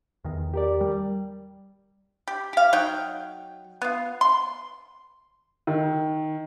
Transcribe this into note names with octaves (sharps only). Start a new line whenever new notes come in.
E2 D#3
G4 A#4 D5
G3
G4
G4 F5
F#3 D#4 G5
B3 F4
C6
D#3